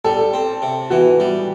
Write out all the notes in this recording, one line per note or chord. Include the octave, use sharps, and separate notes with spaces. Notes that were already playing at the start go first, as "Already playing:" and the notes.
G3 A4
C4
C3
E3 F#4
G3